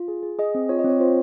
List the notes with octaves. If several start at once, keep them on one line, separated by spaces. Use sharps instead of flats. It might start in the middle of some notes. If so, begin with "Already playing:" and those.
Already playing: F4
G#4
G#4
G#4 D#5
C4
F4 C#5
D#5
C4
C#5
F4 C5